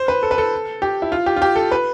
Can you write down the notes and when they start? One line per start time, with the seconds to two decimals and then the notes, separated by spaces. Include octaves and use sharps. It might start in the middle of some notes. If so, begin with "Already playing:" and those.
Already playing: C5
0.08 B4
0.23 A4
0.31 B4
0.38 A4
0.82 G4
1.02 E4
1.12 F4
1.26 G4
1.36 F4
1.42 G4
1.56 A4
1.71 B4